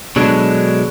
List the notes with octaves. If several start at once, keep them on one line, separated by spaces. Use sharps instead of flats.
B2 D3 F#3 G#3 D4